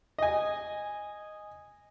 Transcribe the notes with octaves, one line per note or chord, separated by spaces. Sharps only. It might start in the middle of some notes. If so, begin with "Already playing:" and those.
D#5 G#5